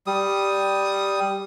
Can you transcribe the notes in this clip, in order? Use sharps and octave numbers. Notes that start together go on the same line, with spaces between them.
G3 D#6